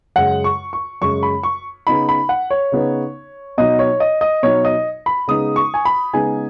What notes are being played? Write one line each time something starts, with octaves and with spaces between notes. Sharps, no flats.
F#2 C#3 G#3 F#5
C#6
C#6
F#2 C#3 G#3 C#6
B5
C#6
C#3 B3 D#4 B5
B5
F#5
C#5
C#3 B3 D#4
B2 F#3 D#4 D#5
C#5
D#5
D#5
B2 F#3 D#4 C#5
D#5
B5
C#3 G#3 B3 D#4 D#6
C#6
G#5
B5
C#3 G#3 B3 D#4 G#5